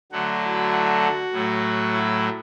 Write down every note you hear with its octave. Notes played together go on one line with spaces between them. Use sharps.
D3 F#3 A3 F#4
E4
F#4
A2 F#3 A3
E4